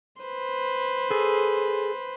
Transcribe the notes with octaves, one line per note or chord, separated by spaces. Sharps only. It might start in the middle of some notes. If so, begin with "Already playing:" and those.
B4 C5
G#4 A4